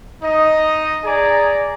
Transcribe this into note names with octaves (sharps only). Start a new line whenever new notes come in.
D#4 D#5
G#4 D5 G#5 A#5